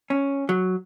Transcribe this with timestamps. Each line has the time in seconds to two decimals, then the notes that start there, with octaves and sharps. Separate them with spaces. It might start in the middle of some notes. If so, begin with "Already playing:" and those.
0.10 C#4
0.49 F#3